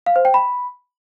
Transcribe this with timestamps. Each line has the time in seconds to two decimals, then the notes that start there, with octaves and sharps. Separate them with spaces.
0.06 F5
0.16 C5
0.25 G5
0.34 B5